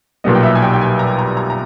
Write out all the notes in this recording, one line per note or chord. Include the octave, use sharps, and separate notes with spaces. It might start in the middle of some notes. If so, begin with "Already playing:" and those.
B1 A#2 G3 B3 D#5
G5
E5
G#5
G5
G5
G#5
A#5
A#5
A#5
A#5